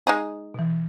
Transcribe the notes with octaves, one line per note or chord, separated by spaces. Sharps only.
G#3 D#4 G#4
B2 E3